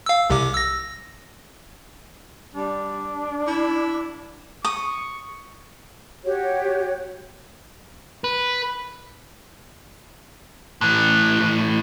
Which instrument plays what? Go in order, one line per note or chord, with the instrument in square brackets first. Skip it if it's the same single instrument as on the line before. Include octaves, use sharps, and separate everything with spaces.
[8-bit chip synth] F5 E6
C2 C3 D6
E6 A#6
[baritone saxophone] G3 [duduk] D4
[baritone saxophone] E4
[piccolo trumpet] C#6 [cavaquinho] D#6
[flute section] F#4 G4 C#5
[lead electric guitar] B4
[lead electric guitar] A2 E3 [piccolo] F#6